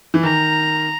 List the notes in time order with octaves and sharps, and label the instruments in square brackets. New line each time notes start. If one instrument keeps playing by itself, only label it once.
[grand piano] E3
[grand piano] D#3 [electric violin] A#5